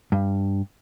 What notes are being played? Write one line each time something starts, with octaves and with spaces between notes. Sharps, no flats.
G2